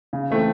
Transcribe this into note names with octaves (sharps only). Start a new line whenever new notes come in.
C#3
E3 A3 C4